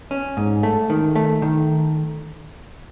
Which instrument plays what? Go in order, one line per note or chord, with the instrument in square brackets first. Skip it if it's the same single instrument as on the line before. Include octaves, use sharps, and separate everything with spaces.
[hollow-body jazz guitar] C#4
G#2
A3
D#3
A3
D#3